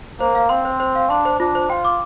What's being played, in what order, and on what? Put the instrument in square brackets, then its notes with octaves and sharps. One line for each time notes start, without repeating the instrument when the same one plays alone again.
[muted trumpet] A#3 [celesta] C5
[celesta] F5
[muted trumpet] C4 [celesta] C6
[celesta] C5
C5
F5
[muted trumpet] D4 [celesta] C6
[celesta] C5
[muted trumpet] D4 [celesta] F4
[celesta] C5
[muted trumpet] F4 [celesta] G5
[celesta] D6